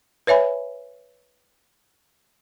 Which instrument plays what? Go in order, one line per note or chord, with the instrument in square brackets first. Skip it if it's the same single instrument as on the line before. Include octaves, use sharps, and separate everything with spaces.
[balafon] B4 C#5 E5 G#5 B5